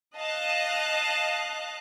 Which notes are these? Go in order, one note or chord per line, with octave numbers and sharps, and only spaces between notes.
D#5 F5 A5 F#6